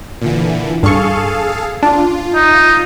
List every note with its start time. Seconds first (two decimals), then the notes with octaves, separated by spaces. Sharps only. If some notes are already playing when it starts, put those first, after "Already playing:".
0.22 A#2 D3 E3
0.83 G2 G#4 A4 F5 C#6
1.83 D4 F4
2.35 D#4